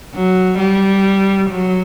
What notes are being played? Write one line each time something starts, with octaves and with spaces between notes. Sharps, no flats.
F#3
G3
F#3